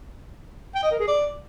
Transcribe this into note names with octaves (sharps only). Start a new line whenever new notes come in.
G5
D#5
A#4
G#4
D5